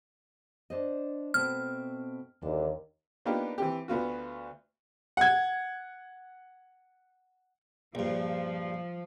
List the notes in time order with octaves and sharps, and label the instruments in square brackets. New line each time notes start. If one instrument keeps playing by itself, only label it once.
[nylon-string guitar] D4 C5 D#5
[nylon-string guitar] B2 A3 C4 [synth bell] F6
[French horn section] D#2 [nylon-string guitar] D3
[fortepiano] A#3 B3 D4 D#4 F4 G4
E3 C4 G4
D2 B3 F4 F#4
[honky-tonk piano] F#5 G#6
[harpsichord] A#1 G2 [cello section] F3